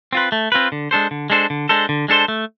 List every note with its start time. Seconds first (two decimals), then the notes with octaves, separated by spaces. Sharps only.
0.13 C4 F4 B4
0.32 A3
0.52 C4 F4 B4
0.72 D3
0.91 G#3 D4 A4 C5
1.11 D3
1.30 G#3 D4 A4 C5
1.50 D3
1.69 G#3 D4 A4 C5
1.89 D3
2.08 G#3 D4 A4 C5
2.28 A3